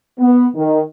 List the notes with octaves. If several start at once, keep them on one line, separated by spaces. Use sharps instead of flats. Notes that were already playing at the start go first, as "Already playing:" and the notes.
B3
D#3